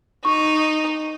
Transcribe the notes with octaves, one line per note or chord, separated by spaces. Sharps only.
D#4 C#6